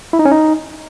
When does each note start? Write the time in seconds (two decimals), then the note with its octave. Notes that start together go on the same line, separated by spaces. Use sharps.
0.13 E4
0.19 D#4
0.25 C#4
0.31 D#4